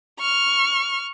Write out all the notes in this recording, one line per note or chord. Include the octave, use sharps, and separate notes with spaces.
C#6 F6